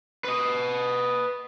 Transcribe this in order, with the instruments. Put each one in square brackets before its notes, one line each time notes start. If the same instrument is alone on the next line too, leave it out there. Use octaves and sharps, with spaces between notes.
[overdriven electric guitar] B4 D#5